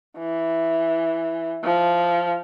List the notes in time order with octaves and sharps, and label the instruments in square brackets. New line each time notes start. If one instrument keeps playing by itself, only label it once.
[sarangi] E3
F3